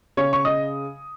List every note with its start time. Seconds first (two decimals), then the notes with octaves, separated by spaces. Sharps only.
0.17 C#3 C#5 C#6
0.33 C#6
0.45 D#5 D#6